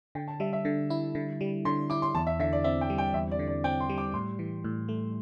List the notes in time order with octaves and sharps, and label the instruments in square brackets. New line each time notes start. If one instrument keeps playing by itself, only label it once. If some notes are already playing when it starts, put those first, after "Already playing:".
[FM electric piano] D3 [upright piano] G5
[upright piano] A5
[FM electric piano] G3 [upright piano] E5
[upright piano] E5
[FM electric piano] D3
E4
D3
G3
[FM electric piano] D3 [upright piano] C6
[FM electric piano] E4 [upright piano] D6
[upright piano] C6
[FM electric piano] E2 [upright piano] A5
[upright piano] E5
[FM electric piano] D3 [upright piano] E5
[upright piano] D5
[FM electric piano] C4 [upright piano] E5
[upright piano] G5
[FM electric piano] G3
[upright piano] G5
[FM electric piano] E2 [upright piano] E5
[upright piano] D5
[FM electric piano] D3
[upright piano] D5
[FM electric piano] C4 [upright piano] G5
[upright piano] C6
[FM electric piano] G3
[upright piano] D6
[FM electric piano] A2 [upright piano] C6
[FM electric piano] E3
A2
A3